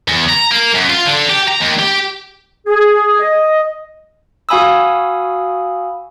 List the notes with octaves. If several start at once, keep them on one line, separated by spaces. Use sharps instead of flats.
E2
A#5
A#3
F#2
F4
D3
G4
A#5
D#2
G4
G#4
D#5
F#4 F5 G#5 B5 D#6 E6